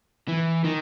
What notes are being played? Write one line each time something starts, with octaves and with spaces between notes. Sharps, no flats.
E3
D#3